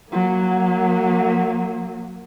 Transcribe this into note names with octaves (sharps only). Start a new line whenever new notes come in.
F#3 A#3